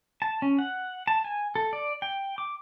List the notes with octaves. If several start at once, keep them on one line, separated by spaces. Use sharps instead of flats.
A5
C#4
F#5
A5
G#5
A4
D5
G5
D6